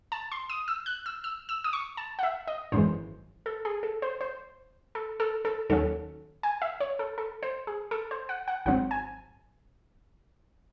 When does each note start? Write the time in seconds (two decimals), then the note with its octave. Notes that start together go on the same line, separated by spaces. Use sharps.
0.12 A5
0.32 C6
0.49 D#6
0.68 E6
0.86 F#6
1.06 E6
1.24 E6
1.49 E6
1.64 D#6
1.73 C#6
1.97 A5
2.19 F#5
2.23 E5
2.47 D#5
2.72 G#1 F#2 E3 G#3 C5
3.46 A4
3.65 G#4
3.83 A4
4.02 C5
4.21 C5
4.95 A4
5.20 A4
5.45 A4
5.70 D#2 D#3 F#3 C#4 A4
6.43 G#5
6.62 E5
6.80 C#5
6.99 A4
7.18 A4
7.43 C5
7.67 G#4
7.91 A4
8.11 C5
8.29 F#5
8.48 F#5
8.66 G#1 G#2 F#3 C4 F#5
8.91 G#5